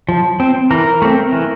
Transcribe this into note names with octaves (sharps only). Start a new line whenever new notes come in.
F3
C4
E3 A#4
A3 C4
E3